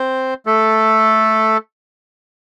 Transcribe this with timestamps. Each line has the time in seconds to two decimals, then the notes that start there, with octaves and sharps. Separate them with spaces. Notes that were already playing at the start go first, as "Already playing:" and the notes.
Already playing: C4 C5
0.46 A3 A4